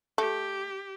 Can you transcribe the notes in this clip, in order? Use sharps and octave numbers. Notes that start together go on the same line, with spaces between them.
A3 G4